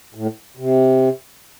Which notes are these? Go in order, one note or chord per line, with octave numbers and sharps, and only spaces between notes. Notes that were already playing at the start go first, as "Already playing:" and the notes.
A2
C3